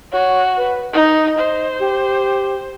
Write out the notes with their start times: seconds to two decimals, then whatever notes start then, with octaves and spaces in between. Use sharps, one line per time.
0.12 F#4 C#5
0.57 B4
0.93 D#4 D#5
1.38 C5
1.80 G4